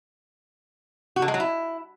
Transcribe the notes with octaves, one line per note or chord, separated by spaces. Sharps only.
F#4
D3
G#3
F#3
E4